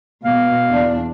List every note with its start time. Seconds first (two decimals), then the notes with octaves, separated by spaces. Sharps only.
0.24 B2 F5
0.69 E2 D4